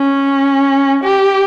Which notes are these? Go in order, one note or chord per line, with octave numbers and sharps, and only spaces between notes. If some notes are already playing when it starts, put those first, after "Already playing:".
Already playing: C#4
G4